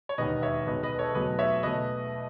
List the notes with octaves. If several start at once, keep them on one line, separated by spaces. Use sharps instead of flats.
C#5
E1 D#2 D#3 B4 D#5
C#5 E5
B1 B2 G#3 B4 D#5
B4 D#5
A4 C#5
E2 B2 F#3 A3 B4 D#5
C#5 E5
B2 A3 B4 D#5